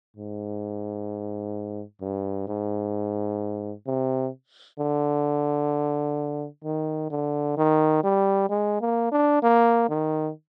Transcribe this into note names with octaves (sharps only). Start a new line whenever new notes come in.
G#2
G2
G#2
C3
D3
D#3
D3
D#3
G3
G#3
A#3
D4
A#3
D#3